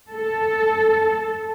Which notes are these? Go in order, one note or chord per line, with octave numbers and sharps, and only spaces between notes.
A4